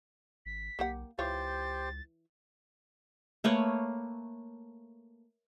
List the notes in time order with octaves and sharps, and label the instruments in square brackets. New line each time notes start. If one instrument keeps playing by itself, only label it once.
[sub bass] G#1 [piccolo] B6
[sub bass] B1 [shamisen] A#3 G4 F#5
[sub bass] C#2 [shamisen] E3 F4 C#5 [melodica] G4 C5 [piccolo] A6
[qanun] A3 A#3 B4 C#5